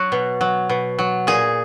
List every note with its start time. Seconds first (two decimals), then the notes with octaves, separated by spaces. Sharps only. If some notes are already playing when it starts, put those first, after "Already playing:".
Already playing: F#3 F#4
0.12 B2
0.41 F#3
0.69 B2
0.99 F#3
1.27 A#2 G#4